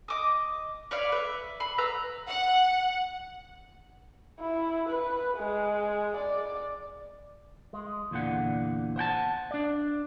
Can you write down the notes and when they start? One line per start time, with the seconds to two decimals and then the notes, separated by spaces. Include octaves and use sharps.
0.08 D#5 D6 D#6
0.91 B4 C#5 D5 F5
1.12 B4 E5
1.60 B5 C6
1.78 B4 A#5 E6
2.28 F#5
4.39 E4
4.89 B4
5.37 G#3
6.17 D5
7.73 G#3
8.11 E2 A#2 D3 F#5
8.96 C5 F#5 G5 A5
9.51 D4 D5